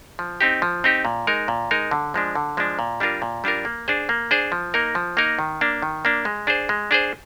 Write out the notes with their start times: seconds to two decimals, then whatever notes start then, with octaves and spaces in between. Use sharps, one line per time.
0.19 F3
0.41 C4 D#4 G4
0.62 F3
0.84 C4 D#4 G4
1.05 A#2
1.27 G#3 D#4 A#4
1.48 A#2
1.71 G#3 D#4 A#4
1.91 D3
2.14 F3 G#3 D4
2.35 D3
2.57 F3 G#3 D4
2.79 A#2
3.00 G3 D4 F4 A#4
3.22 A#2
3.44 G3 D4 F4 A#4
3.65 A#3
3.88 D4 G#4 C5
4.09 A#3
4.31 D4 G#4 C5
4.52 F3
4.74 A#3 D#4 A#4
4.95 F3
5.17 A#3 D#4 A#4
5.39 D#3
5.61 A#3 D4
5.82 D#3
6.05 A#3 D4
6.25 G#3
6.47 D4 G#4 C5
6.69 G#3
6.91 D4 G#4 C5